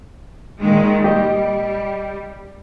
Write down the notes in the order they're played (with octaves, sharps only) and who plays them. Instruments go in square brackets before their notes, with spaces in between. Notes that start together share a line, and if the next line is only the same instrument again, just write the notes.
[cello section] A#2 D#3 G#3
[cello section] G3 [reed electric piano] G4 D#5